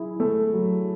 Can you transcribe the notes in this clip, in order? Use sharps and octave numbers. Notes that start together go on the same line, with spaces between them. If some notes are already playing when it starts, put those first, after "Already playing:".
Already playing: F#3 E4 G#4
A3
F#3